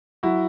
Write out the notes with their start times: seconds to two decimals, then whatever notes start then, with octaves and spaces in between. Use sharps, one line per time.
0.23 F#3 E4 F#4